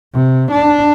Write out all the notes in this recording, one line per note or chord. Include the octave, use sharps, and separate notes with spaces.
C3
D4